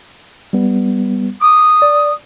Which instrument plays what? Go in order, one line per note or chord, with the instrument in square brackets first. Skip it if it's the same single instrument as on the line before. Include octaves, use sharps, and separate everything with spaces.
[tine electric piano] G3 B3
[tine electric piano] D6 [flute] D#6
[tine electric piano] D5